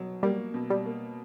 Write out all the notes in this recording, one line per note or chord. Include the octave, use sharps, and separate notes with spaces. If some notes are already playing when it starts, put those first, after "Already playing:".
Already playing: B2 F#3
G3 A#3
B2
G3
A#3